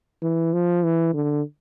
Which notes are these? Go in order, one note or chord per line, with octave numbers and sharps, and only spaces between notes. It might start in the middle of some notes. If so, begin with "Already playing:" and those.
E3
F3
E3
D3